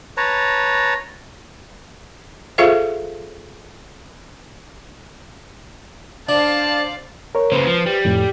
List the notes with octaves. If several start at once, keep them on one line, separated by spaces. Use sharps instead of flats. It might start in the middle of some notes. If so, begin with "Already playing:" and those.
B4 C#5 A5 A#5
F4 G#4 A4 C5 E5 F5
D4 C5 D5 F5 A5
A#4 C#5
C#3 A#3 B4 C5
F3
G3
F2 A2